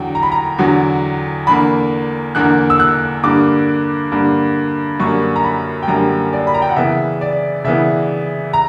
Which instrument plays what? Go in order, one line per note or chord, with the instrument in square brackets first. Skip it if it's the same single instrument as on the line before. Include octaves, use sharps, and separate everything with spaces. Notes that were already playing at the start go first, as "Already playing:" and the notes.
Already playing: [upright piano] E2 D3 F#3 G5
A#5
B5
A#5
E2 D3 F#3
E2 D3 A#3 B5
E2 D3 A#3 F#6
E6
F#6
G2 D3 A#3 D6
G2 D3 A#3
F#2 D3 G3 A#3 C#6
A#5
B5
G5
F#2 D3 G3 A#3 A#5
D5
B5
A#5
G5
F#5
C#3 E3 B3 E5
D5
C#3 E3 B3 E5
A#5